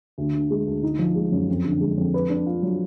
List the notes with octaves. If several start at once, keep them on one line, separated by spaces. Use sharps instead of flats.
D2
D3
G#3
D2
D#4
F3
G#3
F#2
F2
D3
G#3
F2
B4
D4
F4
F#3